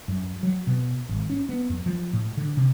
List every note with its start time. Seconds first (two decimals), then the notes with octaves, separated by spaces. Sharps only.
0.08 F#2
0.43 F#3
0.67 B2
1.09 G#1
1.30 C#4
1.49 B3
1.70 F2
1.86 F3
2.13 A2
2.37 D3
2.57 C3